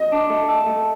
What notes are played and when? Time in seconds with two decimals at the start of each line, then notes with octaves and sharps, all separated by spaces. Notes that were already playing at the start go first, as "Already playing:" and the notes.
Already playing: D#5
0.12 D4
0.30 A3
0.49 A4
0.67 A3